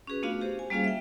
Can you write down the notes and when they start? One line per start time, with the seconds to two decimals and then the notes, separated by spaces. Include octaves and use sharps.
0.07 C#4 F#4 G#4 B4
0.23 A3 B3 D4 F4 F#4 F5
0.41 G4 G#4 C5
0.59 G#5
0.70 G3 A#3 C#4 F4 G#4 F5
0.84 E5 G5